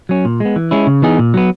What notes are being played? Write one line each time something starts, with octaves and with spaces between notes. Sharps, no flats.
F#3 C#4
A#2
G#3 B3
E3
G#3 C#4 E4
C#3
E3 B3 D#4 G#4
A#2
F#3 B3